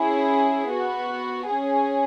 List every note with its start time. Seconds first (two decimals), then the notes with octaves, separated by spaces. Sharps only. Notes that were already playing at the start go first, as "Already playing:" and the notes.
Already playing: C#4 E4 G#4
0.68 B3 F#4
1.48 C#4 G#4